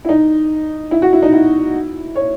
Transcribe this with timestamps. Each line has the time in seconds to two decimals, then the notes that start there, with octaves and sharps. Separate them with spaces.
0.05 E4
0.09 D#4
0.91 E4
1.02 F#4
1.13 E4
1.22 D#4
1.33 E4
2.15 C#5